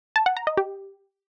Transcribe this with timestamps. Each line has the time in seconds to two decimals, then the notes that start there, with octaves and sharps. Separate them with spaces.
0.16 A5
0.26 F#5
0.37 A#5
0.47 D#5
0.57 G4